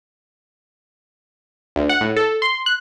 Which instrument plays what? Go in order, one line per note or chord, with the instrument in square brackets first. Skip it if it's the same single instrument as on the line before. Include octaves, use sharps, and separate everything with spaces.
[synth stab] D2
F#5
A2
A4
C6
F#6